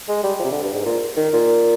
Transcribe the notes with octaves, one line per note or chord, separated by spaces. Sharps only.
G#3
G3
F3
C3
D3
G2
G#2
A#2
D#3
A#2